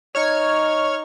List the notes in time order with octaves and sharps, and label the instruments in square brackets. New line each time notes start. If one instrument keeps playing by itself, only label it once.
[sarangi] D#4 [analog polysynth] C#5 F6 G#6